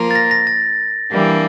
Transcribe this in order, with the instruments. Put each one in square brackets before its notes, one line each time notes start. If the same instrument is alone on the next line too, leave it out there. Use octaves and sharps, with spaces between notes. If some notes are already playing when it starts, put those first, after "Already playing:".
Already playing: [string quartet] F3 A#3 F4 A#4
[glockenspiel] A6
A#6
A#6
A6
[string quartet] E3 G3 A#3 D4